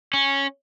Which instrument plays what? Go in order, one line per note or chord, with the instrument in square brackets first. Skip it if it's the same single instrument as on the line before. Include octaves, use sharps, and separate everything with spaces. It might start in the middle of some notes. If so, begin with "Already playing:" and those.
[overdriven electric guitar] C#4